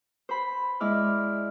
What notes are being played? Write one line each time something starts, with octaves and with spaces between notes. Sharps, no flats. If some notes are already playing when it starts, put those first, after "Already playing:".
C5 B5
G#3 E4 D5 F6